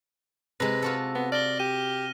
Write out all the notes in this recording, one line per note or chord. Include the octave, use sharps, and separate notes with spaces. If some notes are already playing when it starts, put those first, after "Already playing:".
C3 G#3 B4 A#6
F4 F#4 A4
B3
D5 F6 A#6 G7
G4 D#7